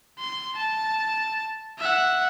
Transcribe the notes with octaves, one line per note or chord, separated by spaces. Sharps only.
C6
A5
E5 F#5